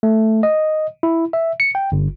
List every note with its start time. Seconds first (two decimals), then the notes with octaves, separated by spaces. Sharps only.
0.03 A3
0.43 D#5
1.03 E4
1.33 E5
1.60 C#7
1.75 G5
1.92 G1